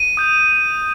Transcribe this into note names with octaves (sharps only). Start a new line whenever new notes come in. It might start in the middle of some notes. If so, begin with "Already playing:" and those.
Already playing: D#7
D#6 G6